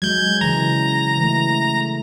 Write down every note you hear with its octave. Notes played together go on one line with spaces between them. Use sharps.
F#3 G#3 G6 G#6
C#3 E3 A#5
E3 A3